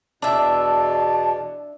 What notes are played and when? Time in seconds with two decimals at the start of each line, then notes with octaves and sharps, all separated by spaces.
0.22 E2 B2 D4 E5 A5